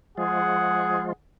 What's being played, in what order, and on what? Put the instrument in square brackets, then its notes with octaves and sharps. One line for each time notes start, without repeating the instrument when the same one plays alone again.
[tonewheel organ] F3 G#3 F4 [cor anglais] G#4 [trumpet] F#5